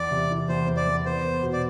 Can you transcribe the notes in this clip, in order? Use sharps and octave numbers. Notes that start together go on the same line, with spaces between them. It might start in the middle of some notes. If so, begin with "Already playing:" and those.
Already playing: E2 D5
C3
E3
E2 C5
E2
D5
E2
B3 C5
B3
B2
D5